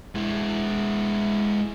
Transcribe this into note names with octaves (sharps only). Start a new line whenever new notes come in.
G#3 E4